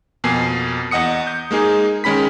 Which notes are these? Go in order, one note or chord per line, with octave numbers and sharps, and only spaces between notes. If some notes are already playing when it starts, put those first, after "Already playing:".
F2 B2 A#3 G#5 C7
E2 D#5 F#5 D#6 C#7
G6
G#3 A#3 D#4 G#4
D#3 G#3 C#4 B5 B6